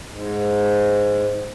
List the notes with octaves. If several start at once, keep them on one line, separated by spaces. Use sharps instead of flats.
G#2